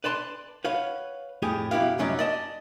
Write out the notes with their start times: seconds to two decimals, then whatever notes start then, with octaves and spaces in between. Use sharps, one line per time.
0.04 B4 D5 A5 C6
0.65 B4 C#5 F5 F#5
1.42 F2 A2 G4 G#4
1.71 F#2 B2 E4 G4 F5
1.98 C2 F#2 F#3 C#4 D#4 D5
2.19 D5 D#5 A5